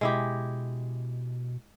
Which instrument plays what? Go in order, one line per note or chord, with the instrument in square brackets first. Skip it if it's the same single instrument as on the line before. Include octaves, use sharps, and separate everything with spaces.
[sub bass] B2 [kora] G#3 E4 G4